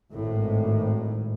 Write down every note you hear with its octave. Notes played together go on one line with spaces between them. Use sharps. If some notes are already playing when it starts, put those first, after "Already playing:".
G#1 A2